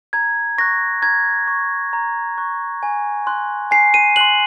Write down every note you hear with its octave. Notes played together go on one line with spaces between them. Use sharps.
A#5 G#6
C#6 F#6 A#6
A#5 G#6
C#6 F#6
A#5
C#6 F#6
G#5
C6 F#6
G#5 C7
D#7
C6 F#6 F#7